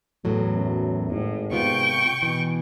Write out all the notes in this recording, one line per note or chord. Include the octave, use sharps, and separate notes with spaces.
E2 A2 F#3 A3
F#2
G#1 A2
C3 B3 F4 G5 C#6
B2 E3